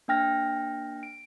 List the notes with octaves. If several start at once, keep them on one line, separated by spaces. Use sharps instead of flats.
A#3 D4 G5 F6 A#6
D7